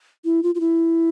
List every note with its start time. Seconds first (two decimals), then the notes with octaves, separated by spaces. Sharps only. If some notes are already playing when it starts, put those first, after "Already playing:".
0.25 E4
0.43 F4
0.55 F4
0.60 E4